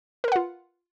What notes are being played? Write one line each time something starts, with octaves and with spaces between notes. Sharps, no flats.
F4 A#4 B4 F#5